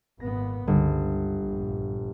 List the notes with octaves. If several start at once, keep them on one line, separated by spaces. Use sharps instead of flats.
G#1 A#2 B3 A#6
G1 C#2
A#1 G2 A#2